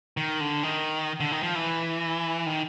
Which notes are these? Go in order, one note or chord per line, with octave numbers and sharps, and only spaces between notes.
D#3
D3
D#3
D3
D#3
F3
E3
D#3